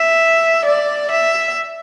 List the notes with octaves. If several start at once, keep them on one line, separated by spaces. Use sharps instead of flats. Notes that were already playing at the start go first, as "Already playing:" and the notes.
Already playing: E5
D5
E5